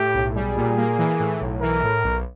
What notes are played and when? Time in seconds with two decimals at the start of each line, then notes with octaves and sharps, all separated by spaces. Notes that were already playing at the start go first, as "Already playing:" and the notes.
Already playing: A2 G4
0.14 B1
0.35 G3 G#4
0.56 A#2
0.77 A#3
0.98 E3
1.20 A2
1.41 B1
1.61 E3 A#4
1.83 A2
2.04 B1